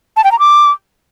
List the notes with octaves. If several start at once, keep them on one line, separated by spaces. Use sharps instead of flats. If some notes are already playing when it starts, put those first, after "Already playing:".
A5
G5
A#5
D6